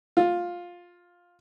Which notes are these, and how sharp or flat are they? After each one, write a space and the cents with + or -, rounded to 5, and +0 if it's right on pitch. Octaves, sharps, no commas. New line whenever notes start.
F4 +10